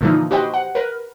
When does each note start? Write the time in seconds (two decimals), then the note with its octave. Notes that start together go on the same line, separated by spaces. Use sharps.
0.01 A#2 D3 E3 F3 D#4
0.31 F#4 G4 B4 C5 D#5 G5
0.54 F#5
0.75 A#4 B4